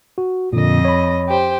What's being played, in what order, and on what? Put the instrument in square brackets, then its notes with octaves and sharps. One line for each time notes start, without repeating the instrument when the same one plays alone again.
[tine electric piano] F#4
[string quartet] F2 D#5 [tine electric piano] A#2 D3
[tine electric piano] C#5 B5
[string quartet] G4 C5